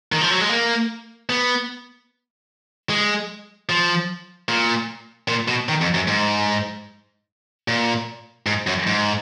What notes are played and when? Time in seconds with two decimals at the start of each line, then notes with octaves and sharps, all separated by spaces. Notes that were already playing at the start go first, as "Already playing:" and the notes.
0.12 D#3
0.21 F3
0.31 F#3
0.40 G#3
0.49 A#3
1.30 B3
2.89 G#3
3.69 F3
4.49 A#2
5.28 A#2
5.48 B2
5.69 D#3
5.81 F2
5.94 F#2
6.07 G#2
7.68 A#2
8.46 G#2
8.67 F#2
8.87 G#2